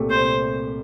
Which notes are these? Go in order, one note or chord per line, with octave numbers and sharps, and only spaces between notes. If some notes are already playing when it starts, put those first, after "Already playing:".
Already playing: C2 A#2 A3 C4 G4
C2 C5